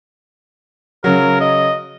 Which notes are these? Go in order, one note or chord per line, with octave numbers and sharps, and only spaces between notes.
C#3 F#3 A#4
D#5